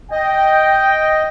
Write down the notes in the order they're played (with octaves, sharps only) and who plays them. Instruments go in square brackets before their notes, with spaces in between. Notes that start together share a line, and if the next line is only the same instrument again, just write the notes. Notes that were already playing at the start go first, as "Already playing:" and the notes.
[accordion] D#5 [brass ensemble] G5